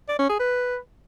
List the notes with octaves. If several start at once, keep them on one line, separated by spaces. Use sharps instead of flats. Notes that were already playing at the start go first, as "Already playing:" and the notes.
D5
C#4
G#4
B4